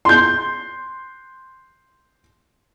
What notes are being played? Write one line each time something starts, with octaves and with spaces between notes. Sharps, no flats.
C6 G6